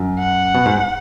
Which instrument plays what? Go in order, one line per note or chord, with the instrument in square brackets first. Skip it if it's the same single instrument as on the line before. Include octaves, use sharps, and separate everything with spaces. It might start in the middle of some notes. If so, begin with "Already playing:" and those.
Already playing: [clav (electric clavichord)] F#2
[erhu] F#5
[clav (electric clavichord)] B2
G#2